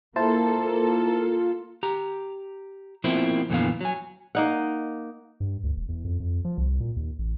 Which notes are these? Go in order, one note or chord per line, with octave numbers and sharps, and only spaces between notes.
A#3 E4 F4 A4 C5 A5
G4 A#5
B2 F3 A#3 C4 E4
F2 A#2 D3 E3 B3 F5
F#3 G#5
A#3 D#4 F#5
G2
D2
E1
E2
F2
F2
F3
C2
A#2
D#2
A1